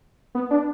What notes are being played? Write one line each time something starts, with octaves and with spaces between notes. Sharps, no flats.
B3
D4